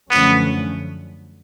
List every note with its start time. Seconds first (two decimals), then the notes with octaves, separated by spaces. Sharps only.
0.10 F#2 D3 F3 A3 B3 C#4